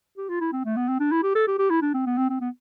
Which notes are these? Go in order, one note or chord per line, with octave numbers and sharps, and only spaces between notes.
G4
F4
E4
C4
A3
B3
C4
D4
E4
G4
A4
G4
G4
E4
D4
C4
B3
C4
C4
B3